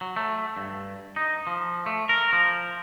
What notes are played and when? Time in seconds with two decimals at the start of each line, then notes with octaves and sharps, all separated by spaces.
0.01 F#3
0.16 A3
0.57 G2
1.16 D#4
1.47 F3
1.86 A3
2.09 A#4
2.33 F3